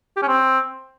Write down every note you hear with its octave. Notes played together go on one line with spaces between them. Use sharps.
G4
C#4
C4